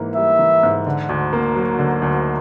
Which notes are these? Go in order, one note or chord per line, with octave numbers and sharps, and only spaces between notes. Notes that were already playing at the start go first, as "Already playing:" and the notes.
Already playing: G#2 E3 A#3
G3 E5
E3
G#2
D3
D2
A#3
F#3
D3
D2